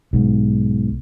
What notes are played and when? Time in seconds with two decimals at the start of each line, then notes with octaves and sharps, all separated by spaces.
0.13 B1 G#2